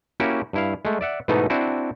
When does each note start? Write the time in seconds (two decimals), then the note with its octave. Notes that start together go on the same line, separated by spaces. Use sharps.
0.20 A#3 C#4 E4 F#4 G4
0.53 G2 E4 F5
0.85 G#3 A3
1.01 D5 E5 F#5
1.28 G#2 B2 E3 A3 B3 D#4
1.50 C4 D4 E4 F#4